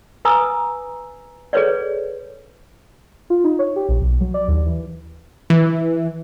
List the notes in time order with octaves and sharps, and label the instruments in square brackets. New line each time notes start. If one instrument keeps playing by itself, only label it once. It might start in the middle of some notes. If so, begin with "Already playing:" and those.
[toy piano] B4 G#5 A#5 D#6 E6
G#4 A4 B4 C#5 D5
[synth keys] F4
D#4
C#5
G4
A#1
B1
F#3
D5
D#2
E3
[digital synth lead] E3